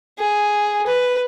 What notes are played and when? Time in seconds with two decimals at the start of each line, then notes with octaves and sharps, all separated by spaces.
0.19 G#4
0.87 B4